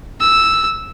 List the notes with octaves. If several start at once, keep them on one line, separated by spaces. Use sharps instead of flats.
E6